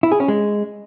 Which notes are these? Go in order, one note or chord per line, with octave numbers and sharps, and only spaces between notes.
E4
G#4
C#4
G#3